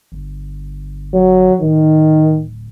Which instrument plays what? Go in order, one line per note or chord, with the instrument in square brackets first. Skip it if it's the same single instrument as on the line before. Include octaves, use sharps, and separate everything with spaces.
[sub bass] G1
[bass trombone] F#3
[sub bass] D1 [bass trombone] D#3